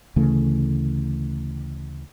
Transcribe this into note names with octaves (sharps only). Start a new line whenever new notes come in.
D2 C#3 E3 A3